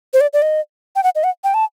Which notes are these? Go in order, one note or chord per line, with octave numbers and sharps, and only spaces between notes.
C5
D5
D5
D#5
G5
F#5
D#5
F#5
G5
A5